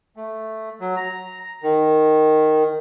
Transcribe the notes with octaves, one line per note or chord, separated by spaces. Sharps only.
A3
F#3
A#5
D#3